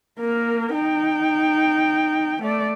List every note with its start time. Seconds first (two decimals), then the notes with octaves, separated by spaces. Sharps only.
0.19 A#3 A#4
0.73 D#4 G5
2.43 A3 D5